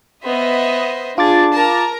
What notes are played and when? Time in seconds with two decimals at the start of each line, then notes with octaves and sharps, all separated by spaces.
0.24 B3 C5 D#5 E5
1.18 D4 F4 G#4 D6 A6
1.54 A#4 A5 A#5